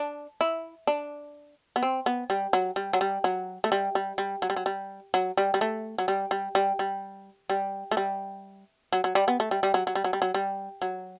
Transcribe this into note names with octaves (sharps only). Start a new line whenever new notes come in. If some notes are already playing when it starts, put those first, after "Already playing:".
Already playing: D4
E4
D4
B3
C4
B3
G3
F#3
G3
F#3
G3
F#3
A3
G3
G3
G3
F#3
G3
F#3
G3
F#3
G3
G3
A3
F#3
G3
G3
G3
G3
G3
A3
G3
F#3
F#3
G3
B3
A3
G3
G3
F#3
F#3
G3
F#3
G3
F#3
G3
F#3